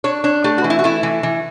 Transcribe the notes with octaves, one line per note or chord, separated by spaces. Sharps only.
D4 C#5
D4 C#5
A3 G4
F#4
E3
E4
F#4
A3 E4
E3
E3